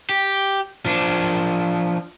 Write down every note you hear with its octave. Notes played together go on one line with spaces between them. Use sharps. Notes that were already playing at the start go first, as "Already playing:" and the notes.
G4
F3 D4